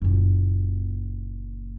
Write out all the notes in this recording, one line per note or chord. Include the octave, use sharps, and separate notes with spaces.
F#1 A#2